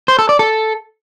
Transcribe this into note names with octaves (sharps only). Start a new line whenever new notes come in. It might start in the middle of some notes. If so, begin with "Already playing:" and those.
C5
A4
D5
A4